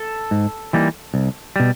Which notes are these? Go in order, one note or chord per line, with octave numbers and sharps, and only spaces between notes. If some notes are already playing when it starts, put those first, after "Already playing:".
Already playing: A4
G#2
E3 G3 A#3 D#4
C2
B2 G3